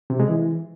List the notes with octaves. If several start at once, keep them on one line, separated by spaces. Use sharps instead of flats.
C3
G#3
E3